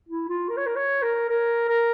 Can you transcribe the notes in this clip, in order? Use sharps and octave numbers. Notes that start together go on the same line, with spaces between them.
E4
F4
A#4
C#5
A#4
C#5
A#4
A#4
A#4